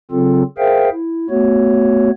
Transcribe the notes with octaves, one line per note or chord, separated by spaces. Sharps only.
C#3 F#3 C4 F4 A4
G#4 A#4 C5 E5 F5 G5
E4
A3 B3 F#4 C#5